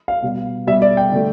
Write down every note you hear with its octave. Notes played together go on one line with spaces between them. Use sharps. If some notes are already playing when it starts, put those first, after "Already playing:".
F5
B2 G3
B2 G3 E5
D5
G5
D3 A3